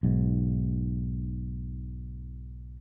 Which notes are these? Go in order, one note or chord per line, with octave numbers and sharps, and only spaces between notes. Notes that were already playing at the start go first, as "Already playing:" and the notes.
B1 G#2